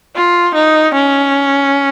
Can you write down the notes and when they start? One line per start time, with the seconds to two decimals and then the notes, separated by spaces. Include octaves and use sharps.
0.16 F4
0.55 D#4
0.94 C#4